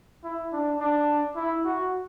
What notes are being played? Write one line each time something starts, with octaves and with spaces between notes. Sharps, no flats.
E4
D4
D4
E4
F#4